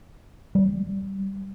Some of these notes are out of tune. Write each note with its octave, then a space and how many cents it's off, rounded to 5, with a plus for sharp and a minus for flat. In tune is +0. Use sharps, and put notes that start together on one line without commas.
G3 -10